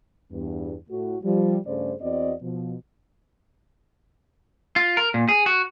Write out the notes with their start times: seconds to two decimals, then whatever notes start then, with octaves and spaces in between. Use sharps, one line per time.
0.32 E2 G2
0.90 A2 F#4
1.22 F3 G3
1.66 G2 C#3 A3 G#4 C5 D5
2.01 E2 C4 F#4 D5 D#5
2.41 B2 F3
4.76 F4
4.97 A#4
5.14 A#2
5.28 G#4
5.46 F#4